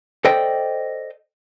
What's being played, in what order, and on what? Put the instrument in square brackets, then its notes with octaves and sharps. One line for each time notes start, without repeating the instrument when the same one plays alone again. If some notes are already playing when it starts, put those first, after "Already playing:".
[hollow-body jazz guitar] A4 C5 D5 D#5 G5